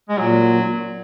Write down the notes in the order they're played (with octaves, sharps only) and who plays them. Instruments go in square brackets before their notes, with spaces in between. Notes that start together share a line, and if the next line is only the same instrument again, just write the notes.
[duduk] G#3
[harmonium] A#2 [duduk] F#3